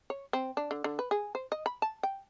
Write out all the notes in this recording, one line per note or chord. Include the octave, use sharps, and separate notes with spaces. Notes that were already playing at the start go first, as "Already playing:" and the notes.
C#5
C4
D4
D3
D3
B4
G#4
C5
D#5
B5
A5
G5